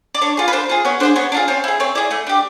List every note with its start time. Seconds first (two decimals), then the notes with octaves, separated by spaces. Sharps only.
0.15 D5
0.21 D4 C#5
0.37 F4 G#4
0.48 B4
0.53 D4 C5
0.69 F4 G#4
0.85 B3 C#5
1.00 D4 F4 G#4 C5
1.16 B3 C#5
1.32 D4
1.35 F4 G#4
1.48 C4 C#5
1.64 E4 G#4
1.80 C4 C#5
1.95 E4 G#4 D5
2.11 A3 D#5
2.27 D4 G4